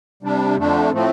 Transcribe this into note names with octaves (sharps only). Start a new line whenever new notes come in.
C3 G3 D4
F2 D3 A3 D4
A2 F3 A3 C4